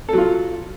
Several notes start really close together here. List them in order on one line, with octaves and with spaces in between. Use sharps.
A4 F#3 F4